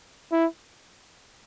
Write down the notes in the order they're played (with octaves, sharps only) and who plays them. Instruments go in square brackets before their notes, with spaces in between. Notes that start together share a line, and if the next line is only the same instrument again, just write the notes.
[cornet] E4